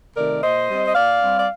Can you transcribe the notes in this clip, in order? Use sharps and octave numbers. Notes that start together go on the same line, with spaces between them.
C3 D#3 A3 A#4 D5
A#2 C5 D#5
G3 C4
D#5
A#2 D5 F5
G3 C4
D5